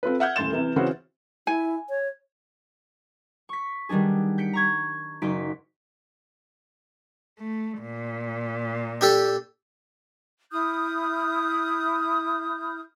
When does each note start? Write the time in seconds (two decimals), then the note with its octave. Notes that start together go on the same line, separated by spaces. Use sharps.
0.03 C4 F4 A4 B4
0.20 E5 F#5 F6 G6 G#6
0.36 D#1 A2 C6 A6 E7
0.53 C3 E3
0.76 C#3 E3 C4 C#4 F#4 C5
1.47 E4 G#5
1.89 C#5
3.49 C#6 B6
3.89 D#3 G3 B3 D4 G#4
4.38 G6 B6 C#7 D7
4.53 A#5 C#6 G#6
5.22 F#1 D#4 F#4 C6 B6 D7
7.38 A3
7.81 A#2
9.01 D4 G4 A4
10.51 E4 D#6 F6 G6